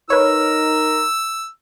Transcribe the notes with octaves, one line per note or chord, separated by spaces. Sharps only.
D#4 A#4 B4 C#5 E6